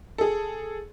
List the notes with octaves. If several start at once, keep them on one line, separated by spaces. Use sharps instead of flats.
G#4 A4